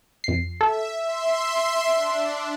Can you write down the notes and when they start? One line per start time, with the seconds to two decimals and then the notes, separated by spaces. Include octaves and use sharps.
0.24 F2 C7
0.61 A4 E5
1.03 E5 C6
1.90 D4